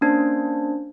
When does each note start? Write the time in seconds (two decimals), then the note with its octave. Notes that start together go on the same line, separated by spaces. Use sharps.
0.01 A#3 C#4 D4 C5